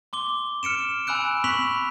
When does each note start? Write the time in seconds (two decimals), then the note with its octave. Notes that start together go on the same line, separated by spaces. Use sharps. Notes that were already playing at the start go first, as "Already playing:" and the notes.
0.13 C6 D6 G7
0.63 F6 C#7 D7 E7
1.07 G#5 B5 E6 F#6 D7
1.44 B5 C#6 F#6 B6 F7 F#7